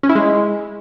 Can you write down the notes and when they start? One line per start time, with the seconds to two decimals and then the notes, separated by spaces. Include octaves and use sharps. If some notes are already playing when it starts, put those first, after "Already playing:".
0.03 C#4
0.09 E4
0.15 G#3